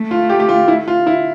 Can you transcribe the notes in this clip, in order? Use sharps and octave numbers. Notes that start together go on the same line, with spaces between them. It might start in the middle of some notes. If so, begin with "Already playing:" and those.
Already playing: A3
F4
G4
G4
F4
E4
F4
E4